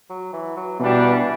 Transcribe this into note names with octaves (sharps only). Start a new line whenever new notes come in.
F#3
E3
F#3
B2 E3 G3 D4